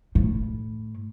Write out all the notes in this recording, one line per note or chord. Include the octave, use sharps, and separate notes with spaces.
A2